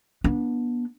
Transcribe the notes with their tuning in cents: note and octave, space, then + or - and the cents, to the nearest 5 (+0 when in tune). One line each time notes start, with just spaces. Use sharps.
B3 -30 D4 +0